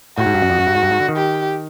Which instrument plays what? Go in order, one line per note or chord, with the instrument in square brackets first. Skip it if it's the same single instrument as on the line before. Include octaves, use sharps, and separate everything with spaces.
[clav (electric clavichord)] A2 [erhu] F#4
[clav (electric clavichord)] G#2
G2
F#2
F2
F#2
G2
G#2
G2
G#2
D3
D#3
[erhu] G4